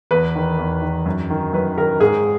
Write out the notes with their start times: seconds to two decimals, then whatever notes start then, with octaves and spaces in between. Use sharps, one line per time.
0.11 E2 B4
0.36 D#3
0.58 E2
0.82 D#3
1.06 F#2
1.30 D#3
1.53 F#2 B4
1.78 D#3 A#4
2.00 G#2 G#4